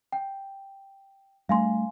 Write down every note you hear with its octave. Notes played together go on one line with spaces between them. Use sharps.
G5
G3 A3 D4 F5 G#5 C6